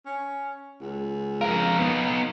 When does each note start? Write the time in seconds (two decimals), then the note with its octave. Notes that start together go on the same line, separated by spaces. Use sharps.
0.06 C#4
0.81 C#2
1.41 F2 A#4 F5
1.78 B3 D#4